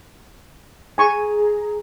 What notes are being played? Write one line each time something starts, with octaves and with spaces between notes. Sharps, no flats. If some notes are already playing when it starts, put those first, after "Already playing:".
G#4 G#5 A#5 C#6